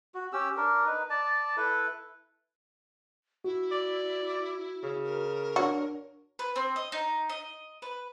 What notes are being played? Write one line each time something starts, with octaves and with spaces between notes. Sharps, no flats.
F#4
C#4 G4 E6
D4 A#4
D#4 B4
D5 A5
E4 A4 B4
E4 F#4
D5
C#3
A#4
D4 F#4 C#5
B4
C4
D#5
D#4
D#5
B4